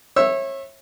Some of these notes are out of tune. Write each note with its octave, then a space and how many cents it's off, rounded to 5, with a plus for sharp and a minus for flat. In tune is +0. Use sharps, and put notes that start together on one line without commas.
C#5 -30 E5 +0 E6 +0